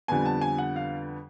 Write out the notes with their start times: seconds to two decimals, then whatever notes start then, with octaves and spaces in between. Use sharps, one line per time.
0.08 F2 D3 G3 B3 G#5
0.25 A5
0.41 G#5
0.58 F#5
0.76 F5